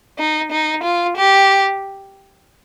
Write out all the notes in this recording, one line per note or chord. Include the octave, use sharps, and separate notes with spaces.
D#4
D#4
F4
G4